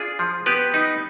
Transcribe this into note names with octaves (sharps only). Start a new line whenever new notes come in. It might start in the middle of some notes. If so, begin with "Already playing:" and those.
Already playing: D4 F4 G#4
F3
B3 G4 B4
D#4